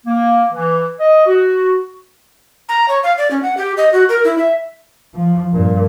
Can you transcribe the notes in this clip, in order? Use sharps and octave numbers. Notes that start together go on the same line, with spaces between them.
A#3
E3
D#5
F#4
A#5
C#5
F5
D5
C#4
F#5
G4
D#5
F#4
A#4
E4
E5
F3
G2 A#2